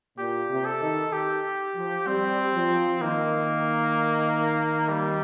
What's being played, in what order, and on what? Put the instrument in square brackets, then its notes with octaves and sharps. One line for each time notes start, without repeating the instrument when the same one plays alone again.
[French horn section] A#2 [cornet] G4
[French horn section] C3
[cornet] A4
[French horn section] D#3
[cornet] G4
[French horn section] F3
[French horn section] G3 [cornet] C4
[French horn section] F3
[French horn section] D#3 [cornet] A#3
[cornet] G3